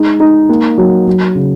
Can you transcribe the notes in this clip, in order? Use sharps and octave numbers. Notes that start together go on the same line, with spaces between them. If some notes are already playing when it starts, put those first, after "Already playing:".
Already playing: G#3 D#4
D#4
A#3
F#3
F#3
C#3